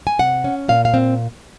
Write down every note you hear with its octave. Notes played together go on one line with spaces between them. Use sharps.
G#5
C3 F#5
C#4
A#2 F5
F5
C4